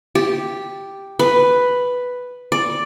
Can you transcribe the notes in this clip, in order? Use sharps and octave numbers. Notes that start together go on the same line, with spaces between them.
G4
B4
D5